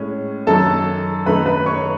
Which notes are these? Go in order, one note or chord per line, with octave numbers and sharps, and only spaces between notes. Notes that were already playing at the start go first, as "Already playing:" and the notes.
Already playing: A2 G#3 C#4
F#2 D#3 F#3 A4 A5
F#2 D#3 A3 D#4 B4 B5
B4 B5
C#5 C#6